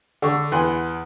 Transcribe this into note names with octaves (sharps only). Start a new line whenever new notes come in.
D3 C#6
E2 B4 F#5 G#5 C6